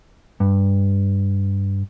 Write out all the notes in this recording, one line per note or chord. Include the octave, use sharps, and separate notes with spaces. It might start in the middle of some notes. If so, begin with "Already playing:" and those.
G2